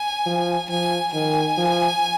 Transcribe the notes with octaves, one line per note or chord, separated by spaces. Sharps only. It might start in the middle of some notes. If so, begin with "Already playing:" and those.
Already playing: G#5
F3
F3 G#5
D#3 G#5
F3